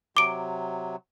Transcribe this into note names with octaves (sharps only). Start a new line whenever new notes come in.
C3 F#3 D6 D7